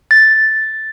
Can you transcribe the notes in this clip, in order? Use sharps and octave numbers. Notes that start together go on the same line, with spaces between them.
A6